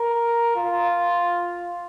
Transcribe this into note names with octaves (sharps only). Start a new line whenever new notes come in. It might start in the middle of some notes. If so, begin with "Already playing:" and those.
Already playing: A#4
F4